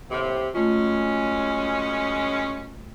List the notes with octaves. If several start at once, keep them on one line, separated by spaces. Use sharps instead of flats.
D#2 A2 C3
F#2 G#3 A3 C#4 F4